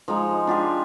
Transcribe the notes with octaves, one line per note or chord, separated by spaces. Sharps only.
F3 G#3 D#4
D4 F4 G4 G#4